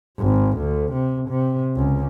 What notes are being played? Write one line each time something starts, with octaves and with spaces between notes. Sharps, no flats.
G#1
D2
C3
C3
C#2